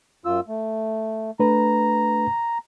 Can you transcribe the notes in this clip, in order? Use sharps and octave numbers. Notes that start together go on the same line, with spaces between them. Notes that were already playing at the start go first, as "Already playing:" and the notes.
F#2 F4 E6
A3
A3 D4 B4 A#5